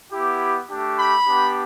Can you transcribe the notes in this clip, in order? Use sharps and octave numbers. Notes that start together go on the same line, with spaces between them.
B3 E4 G4
A3 D4 G4
B5
B3 D4 G4